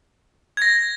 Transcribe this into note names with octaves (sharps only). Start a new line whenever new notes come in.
G#6
A#6